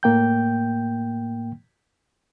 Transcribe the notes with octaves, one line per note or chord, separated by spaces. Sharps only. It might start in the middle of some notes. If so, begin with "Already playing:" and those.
A2 A#3 G5 G6